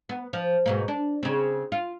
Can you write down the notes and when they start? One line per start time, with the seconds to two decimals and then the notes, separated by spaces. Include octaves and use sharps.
0.09 B3
0.33 F3
0.66 G#2 B2 A#3
0.88 D4
1.23 C#3 C4
1.72 F4